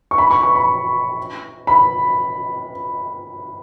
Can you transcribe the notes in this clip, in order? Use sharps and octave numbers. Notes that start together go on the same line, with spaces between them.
C#6
B5
C#6
C#6
B5
B5